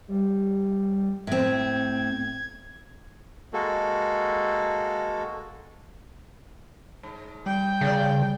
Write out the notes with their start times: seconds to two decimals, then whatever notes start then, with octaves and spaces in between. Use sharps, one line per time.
0.08 G3
1.27 A2 C4 G#6
3.53 G#3 A#3 F#4 A4
7.03 G#2
7.46 G3 G5
7.81 C#3 C#4 D5